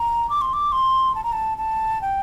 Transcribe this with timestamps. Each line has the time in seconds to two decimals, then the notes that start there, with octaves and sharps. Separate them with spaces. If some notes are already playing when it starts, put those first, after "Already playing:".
Already playing: A#5
0.30 D6
0.41 C6
0.53 D6
0.72 C6
1.15 A5
1.24 A#5
1.32 A5
1.58 A5
2.02 G5